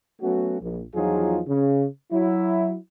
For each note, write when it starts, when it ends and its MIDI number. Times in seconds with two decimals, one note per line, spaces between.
0.22 0.60 54
0.22 0.60 57
0.22 0.60 59
0.22 0.60 61
0.22 0.60 66
0.61 0.83 34
0.95 1.41 40
0.95 1.41 53
0.95 1.41 54
0.95 1.41 63
0.95 1.41 65
0.95 1.41 68
1.48 1.87 49
2.12 2.75 54
2.12 2.75 64